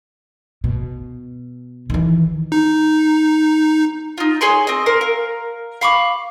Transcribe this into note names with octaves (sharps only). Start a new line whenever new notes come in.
B2
D#3 E3
D#4
D#4 F4
G#4 C#5 G#5 C6
C4 D#5
A#4 C5 E5
A#4 F5
F5 B5 C#6 D6